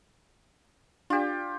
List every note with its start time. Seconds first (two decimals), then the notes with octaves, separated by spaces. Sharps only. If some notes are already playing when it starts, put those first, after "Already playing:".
1.10 D4 F4 G4